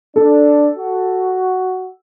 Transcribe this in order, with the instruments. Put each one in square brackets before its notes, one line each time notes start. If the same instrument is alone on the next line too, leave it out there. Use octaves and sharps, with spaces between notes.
[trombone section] D4 [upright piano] A4
[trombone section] F#4